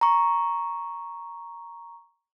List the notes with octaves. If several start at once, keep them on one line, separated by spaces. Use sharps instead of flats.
A#5 C#6